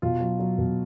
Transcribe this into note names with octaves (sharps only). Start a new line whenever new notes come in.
B2 F4
F#3
F#3
B2